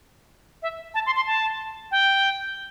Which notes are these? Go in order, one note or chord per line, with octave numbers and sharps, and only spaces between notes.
E5
A5
C6
C6
A5
G5